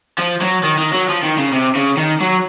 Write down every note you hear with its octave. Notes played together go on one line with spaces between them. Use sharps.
F3
F#3
D#3
D#3
F#3
F3
D#3
C#3
C3
C#3
D#3
F#3